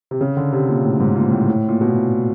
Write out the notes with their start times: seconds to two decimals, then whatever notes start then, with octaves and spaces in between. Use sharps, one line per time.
0.11 C3
0.21 C#3
0.37 D3
0.53 C3
0.68 A#2
0.84 A2
1.00 G#2
1.16 A#2
1.31 A2
1.48 A2
1.69 A#2
1.81 B2
1.90 A#2